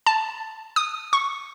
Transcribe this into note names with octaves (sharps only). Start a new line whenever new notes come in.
A5
D#6
C#6